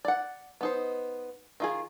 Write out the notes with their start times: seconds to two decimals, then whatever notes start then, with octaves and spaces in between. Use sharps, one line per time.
0.05 D5 F#5
0.61 B3 D#4 C5
1.60 D#3 F4 G#4